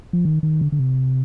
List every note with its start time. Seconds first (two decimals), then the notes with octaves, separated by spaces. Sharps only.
0.13 F3
0.25 D#3
0.43 D#3
0.61 D3
0.72 D3
0.79 C3